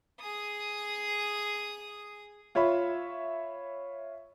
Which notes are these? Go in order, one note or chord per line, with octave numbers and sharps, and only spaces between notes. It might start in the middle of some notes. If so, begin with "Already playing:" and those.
G#4 D#6
F4 C#5 E5 B5